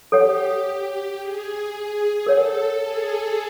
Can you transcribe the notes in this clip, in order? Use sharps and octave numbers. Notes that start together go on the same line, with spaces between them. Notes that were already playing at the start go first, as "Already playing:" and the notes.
G4 A4 C#5 F#5
G#4
A4 A#4 C#5 F#5
G#4